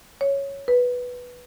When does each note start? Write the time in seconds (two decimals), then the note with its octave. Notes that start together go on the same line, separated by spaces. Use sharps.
0.21 C#5
0.68 B4